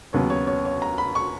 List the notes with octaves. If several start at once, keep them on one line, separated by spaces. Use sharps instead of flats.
D#2 C#3 F#3 B3 C#5
C#5
C#5
C#5
A#5
B5
C#6